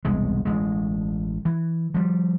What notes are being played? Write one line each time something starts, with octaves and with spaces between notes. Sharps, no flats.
E1 C2 G#3
A1 G#3
E3
F3 G3